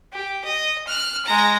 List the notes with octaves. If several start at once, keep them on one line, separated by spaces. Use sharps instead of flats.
G4
D#5
F6 F#6
G#3 A#5